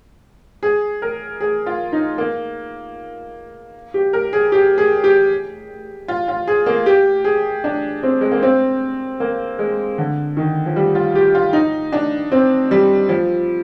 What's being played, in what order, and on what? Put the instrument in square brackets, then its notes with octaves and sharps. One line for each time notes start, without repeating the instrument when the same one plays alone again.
[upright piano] G#4
A#4
G#4
F4
D#4
A#3
G4
A#4
G#4
G4
G#4
G4
F4
F4
G#4
A#3
G4
G#4
D4
C4
G#3
A#3
C4
A#3
G#3
D3
D#3
F3
G3
F4
G4
F4
D#4
D4
C4
G3
F3